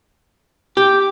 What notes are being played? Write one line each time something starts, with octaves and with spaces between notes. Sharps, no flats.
G4 D6